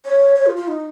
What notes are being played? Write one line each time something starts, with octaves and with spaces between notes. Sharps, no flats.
C#5
C#5
F4
F4
D#4